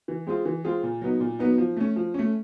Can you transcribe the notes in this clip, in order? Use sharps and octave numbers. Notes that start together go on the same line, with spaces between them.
E3
G#3 C4 F4 G#4
E3
G#3 C4 F4 G#4
A#2
F#3 B3 D#4
A#2
F#3 B3 D#4
F3
A3 C#4
F3
A3 C#4